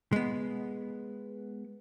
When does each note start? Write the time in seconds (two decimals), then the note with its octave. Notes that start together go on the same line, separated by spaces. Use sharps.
0.12 G#3 B3